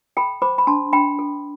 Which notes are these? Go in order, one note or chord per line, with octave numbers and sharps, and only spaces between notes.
A4 G5 B5
C5 B5 D6
B5
D4 A5 C6
D4 G5 B5
A4